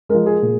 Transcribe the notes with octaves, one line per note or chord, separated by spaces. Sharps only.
F3 G#3 A#4
G#4
A#2